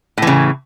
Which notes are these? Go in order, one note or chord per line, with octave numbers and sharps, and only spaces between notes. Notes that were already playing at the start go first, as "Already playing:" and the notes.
A2 C#3 E3